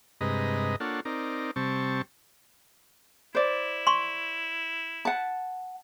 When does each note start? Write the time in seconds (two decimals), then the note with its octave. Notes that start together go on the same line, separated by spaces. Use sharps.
0.21 G2 C3 G#3 B4 D#5 A#5
0.80 A#3 D4 F4 A4 C#5 F#5
1.05 C4 D#4 A#4 D5
1.56 C3 G3 C4 A5 C#6
3.35 E4 C5 D5
3.87 C6 C#6
5.05 F#5 A5